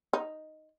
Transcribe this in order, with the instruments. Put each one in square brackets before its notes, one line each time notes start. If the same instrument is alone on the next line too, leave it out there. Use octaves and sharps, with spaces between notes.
[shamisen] D#4